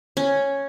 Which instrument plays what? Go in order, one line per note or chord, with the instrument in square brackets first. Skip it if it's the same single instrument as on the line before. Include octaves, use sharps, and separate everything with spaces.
[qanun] C#4